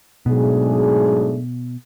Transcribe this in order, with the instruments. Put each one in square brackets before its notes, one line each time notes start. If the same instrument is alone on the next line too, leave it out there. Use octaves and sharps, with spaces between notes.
[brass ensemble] G#2 F#3 A3 D4 G#4 [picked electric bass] B2